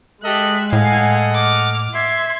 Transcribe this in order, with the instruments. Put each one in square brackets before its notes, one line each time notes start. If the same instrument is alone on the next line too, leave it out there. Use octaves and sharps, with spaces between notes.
[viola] G#3 [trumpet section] G4 A4 D#5 [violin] E5 F#6
[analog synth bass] A2 [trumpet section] A4 D#5 F#5 [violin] F5 G#5
[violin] D6 F6
[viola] E5 [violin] C6 G#6